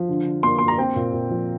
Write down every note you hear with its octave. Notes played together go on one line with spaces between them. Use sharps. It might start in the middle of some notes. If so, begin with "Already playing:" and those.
Already playing: F3
D3
D3
A#3 C6
A#3 C6
A#5
C4 G5
A#2
A#2
F3